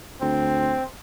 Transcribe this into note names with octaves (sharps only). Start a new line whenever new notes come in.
D2 C4